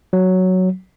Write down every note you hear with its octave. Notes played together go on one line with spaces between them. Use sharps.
F#3